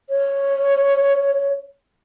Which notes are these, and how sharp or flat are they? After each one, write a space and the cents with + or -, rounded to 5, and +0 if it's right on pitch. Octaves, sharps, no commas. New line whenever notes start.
C#5 -5